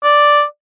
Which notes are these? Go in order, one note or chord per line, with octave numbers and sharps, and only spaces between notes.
D5